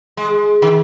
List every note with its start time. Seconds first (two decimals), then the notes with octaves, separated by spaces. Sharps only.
0.17 G#3
0.62 D#3